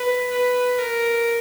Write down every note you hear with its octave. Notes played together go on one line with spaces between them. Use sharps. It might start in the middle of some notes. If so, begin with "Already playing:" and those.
Already playing: B4
B4
A#4